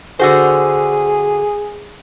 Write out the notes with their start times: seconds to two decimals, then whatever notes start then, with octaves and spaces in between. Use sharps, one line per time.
0.19 D3 F#4 G#4 C5